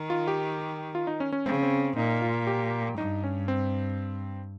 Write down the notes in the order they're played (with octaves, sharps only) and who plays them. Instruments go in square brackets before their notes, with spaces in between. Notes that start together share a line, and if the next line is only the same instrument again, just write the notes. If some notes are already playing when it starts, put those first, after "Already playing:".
Already playing: [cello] D#3
[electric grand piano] F4
G4
F4
D#4
C#4
C#4
[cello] C#3 [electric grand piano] C4
[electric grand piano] C4
[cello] A#2 [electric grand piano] D#4
[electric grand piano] F4
G4
[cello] G2 [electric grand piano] D#4
[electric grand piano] C#4
C4